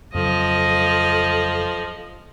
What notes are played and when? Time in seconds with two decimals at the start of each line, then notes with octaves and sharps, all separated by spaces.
0.14 F2 C#3 F3 F#3 A4 D#5